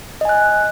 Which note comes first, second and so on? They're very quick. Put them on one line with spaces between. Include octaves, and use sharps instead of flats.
D#5 G#5 F#6